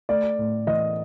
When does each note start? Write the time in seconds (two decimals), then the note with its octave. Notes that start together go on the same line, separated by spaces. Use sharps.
0.09 A3 D5
0.39 A2
0.67 E3 D#5